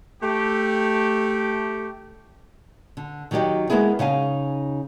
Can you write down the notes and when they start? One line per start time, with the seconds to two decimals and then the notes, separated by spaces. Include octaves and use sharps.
0.22 A3 G4
2.97 D3
3.31 D#3 F#3 D#4 G4 D#5
3.70 G#3 A#3 B3 E4 G#4
3.99 C#3 D#4 F5 G#5